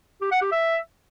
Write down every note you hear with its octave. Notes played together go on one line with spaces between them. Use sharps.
G4
F#5
G4
E5